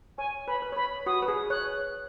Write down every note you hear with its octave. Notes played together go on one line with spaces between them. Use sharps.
C#5 G#5
B4 B5
C#5
B4
C#5
B4 B5
F#4 D#6
B4
G#4
C#5 F#6